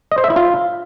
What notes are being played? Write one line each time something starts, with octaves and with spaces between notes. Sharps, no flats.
D#5
C5
E5
E4
F4